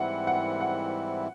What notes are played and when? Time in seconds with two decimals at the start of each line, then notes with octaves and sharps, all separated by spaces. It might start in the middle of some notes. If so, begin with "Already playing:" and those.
Already playing: G#2 E3 G3 C4 E4 F#5
0.27 F#5
0.61 F#5